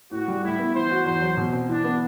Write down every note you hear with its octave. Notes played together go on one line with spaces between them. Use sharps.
A2 F#4
G3
A2 E4
B3
E3 C5
F#4
E2 C5
F#3
B2
C4
E3 D4
B3